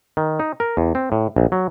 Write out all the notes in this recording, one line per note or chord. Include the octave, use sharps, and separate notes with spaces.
D#3
D#4
A#4
E2
C4
A2
A#1
F#3